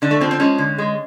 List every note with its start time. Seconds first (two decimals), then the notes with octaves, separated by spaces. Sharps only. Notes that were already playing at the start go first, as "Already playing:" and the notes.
0.02 D3 D4
0.11 A3
0.21 F3 C4
0.31 C4
0.40 G#3 C#4
0.58 D3
0.78 G#3